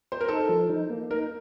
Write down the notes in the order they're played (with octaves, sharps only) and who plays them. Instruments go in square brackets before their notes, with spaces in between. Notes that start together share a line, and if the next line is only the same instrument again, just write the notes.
[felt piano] C5
A#4
[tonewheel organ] D#4 [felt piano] A4
[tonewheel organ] F3
D#4
A#3
[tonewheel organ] D#4 [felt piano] A#4